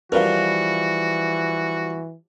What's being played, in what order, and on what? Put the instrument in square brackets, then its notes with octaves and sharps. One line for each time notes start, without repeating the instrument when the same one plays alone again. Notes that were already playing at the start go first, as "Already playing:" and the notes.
[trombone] E3 [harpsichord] F3 G3 [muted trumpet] F#4 [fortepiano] A#4 B4 F5